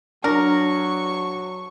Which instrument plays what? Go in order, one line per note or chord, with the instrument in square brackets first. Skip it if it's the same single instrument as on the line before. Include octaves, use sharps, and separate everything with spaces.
[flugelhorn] F#3 [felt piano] D4 [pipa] A#4 [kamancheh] C#6